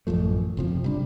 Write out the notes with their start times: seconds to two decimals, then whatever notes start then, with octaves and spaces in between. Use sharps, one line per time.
0.07 A1 F#2 F3 A3
0.57 F#1 C3 F3
0.84 C3 G3 D4